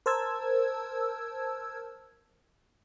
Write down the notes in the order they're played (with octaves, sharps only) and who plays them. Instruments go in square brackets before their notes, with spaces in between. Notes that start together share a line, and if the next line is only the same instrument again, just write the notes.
[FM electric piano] A#4 C5 A5 E6 G#6